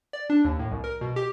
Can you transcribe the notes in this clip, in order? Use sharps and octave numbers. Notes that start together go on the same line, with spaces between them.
D5
D4
D#2
A2
C2
A#4
B2
G4